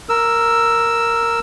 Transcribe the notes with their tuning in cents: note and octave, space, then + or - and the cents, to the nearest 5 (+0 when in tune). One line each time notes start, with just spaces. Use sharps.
A#4 -5 E6 +5